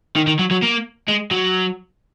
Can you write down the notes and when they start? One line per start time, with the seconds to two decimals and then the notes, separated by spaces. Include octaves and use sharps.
0.16 D#3
0.27 D#3
0.39 F#3
0.51 F#3
0.62 A#3
1.08 G#3
1.31 F#3